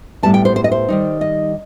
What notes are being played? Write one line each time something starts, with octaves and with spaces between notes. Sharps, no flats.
A2 G3 B3 A5
G5
C5
C5
D#5
C5
D#3 G3 D#4
D#5